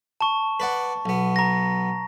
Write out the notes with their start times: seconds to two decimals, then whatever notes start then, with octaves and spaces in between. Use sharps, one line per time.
0.21 A5 C#6
0.60 B4 D5 F#5
1.06 B1 B3
1.36 A#5 A#6